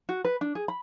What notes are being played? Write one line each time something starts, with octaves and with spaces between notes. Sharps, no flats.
F#4
B4
D4
G#4
B5